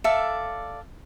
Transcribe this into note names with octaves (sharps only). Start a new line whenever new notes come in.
A4 D5 E5 F5